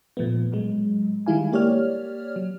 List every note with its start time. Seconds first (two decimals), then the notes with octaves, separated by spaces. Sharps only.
0.17 A#2 F3 A3 B3
0.52 A2 F#3 G#3
1.26 D#3 G3 G#3 E4 F5 G#5
1.53 A#3 G4 C#5 D5 F6
2.36 F#3